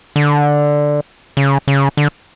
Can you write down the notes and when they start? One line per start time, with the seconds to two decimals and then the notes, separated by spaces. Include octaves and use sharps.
0.16 D3
1.37 C#3
1.68 C#3
1.97 D3